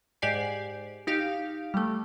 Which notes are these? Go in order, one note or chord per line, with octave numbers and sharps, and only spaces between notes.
G#2 G4 D5 G#5 C7
D#4 G4 F5
G3 A3